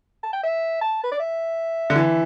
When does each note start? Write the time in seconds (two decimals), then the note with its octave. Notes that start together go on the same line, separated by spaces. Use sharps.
0.23 A5
0.33 G5
0.43 E5
0.81 A5
1.03 B4
1.12 D5
1.19 E5
1.90 D3
1.96 E3